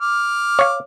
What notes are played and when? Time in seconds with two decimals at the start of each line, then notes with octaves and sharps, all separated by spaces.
0.01 D6 F6
0.59 C#5 F5